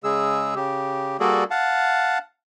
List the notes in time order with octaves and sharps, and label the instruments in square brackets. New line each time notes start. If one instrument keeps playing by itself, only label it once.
[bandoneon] C#3 G#3 G#4 E6
C#3 G4
G3 A#3 F#4 G#4 A4 D5
F5 F#5 A5